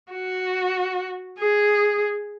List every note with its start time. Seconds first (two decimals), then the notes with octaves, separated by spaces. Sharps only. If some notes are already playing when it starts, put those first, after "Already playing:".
0.12 F#4
1.39 G#4